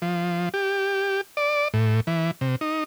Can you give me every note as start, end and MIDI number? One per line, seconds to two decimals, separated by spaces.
0.02 0.49 53
0.54 1.21 67
1.37 1.68 74
1.74 2.00 45
2.07 2.31 52
2.41 2.56 48
2.61 2.84 63